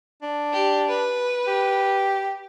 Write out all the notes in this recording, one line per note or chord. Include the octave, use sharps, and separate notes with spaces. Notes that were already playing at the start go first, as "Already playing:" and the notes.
D4
G4
B4
G4